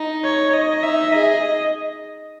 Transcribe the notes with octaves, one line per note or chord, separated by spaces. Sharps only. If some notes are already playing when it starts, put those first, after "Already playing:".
Already playing: D#4
C#5
D#5
D#4 E5
G#4 D#5